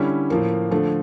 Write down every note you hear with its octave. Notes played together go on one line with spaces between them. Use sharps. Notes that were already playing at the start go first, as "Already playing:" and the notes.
Already playing: D3 G3 C#4 E4
A2 F3 A#3
D3 F3 A3